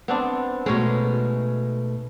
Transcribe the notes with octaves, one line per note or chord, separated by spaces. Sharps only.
B3 C4 D4
B2 G#3 A3 C#4 D#4